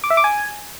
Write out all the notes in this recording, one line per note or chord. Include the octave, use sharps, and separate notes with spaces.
D6
E5
D6
G#5